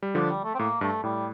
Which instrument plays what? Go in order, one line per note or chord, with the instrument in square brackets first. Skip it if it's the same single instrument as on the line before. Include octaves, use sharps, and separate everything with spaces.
[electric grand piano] G3
[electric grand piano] D3 F3 [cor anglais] D4
[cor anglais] G3
A3
C4
[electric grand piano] A2 [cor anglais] A#3
[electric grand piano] G2 [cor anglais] A3
[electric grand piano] A2 [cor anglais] G3